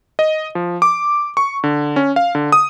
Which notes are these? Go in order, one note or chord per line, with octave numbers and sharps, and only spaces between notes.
D#5
F3
D6
C#6
D3
C#4
F5
D3
D#6